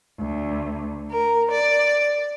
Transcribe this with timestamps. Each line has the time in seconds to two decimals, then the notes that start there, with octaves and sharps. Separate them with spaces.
0.20 D2
1.10 A#4
1.52 D5